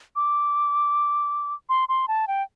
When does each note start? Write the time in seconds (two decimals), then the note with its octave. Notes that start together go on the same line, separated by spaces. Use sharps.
0.16 D6
1.69 C6
1.89 C6
2.08 A5
2.28 G5